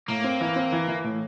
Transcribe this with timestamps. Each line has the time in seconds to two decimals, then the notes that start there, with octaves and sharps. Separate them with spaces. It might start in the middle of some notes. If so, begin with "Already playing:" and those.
0.08 A2 A#3
0.24 C4
0.41 E3
0.56 C4
0.72 E3
0.88 E3
1.04 A2